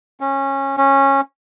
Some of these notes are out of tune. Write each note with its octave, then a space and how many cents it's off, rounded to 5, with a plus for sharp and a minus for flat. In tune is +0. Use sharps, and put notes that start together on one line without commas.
C#4 -20
C#4 -15